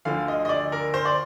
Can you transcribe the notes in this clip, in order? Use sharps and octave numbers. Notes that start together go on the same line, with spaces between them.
D2 D3 F3 F5
D#5
D#5
D5
A#4
C5
D5